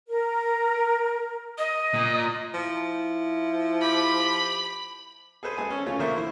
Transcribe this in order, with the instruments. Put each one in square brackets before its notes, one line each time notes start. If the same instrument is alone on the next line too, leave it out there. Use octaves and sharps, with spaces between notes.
[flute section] A#4
[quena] D#5
[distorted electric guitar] A#2
[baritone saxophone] F3 [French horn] E4
[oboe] G4 [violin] B5
[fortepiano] G#4 A4 B4 C5 G#5
G#3 G#4 A4 G#5
C#4 A4
C#3 A3 C#4 F4
A#1 A#3 A#4 C5 E5 C#6
E4 C5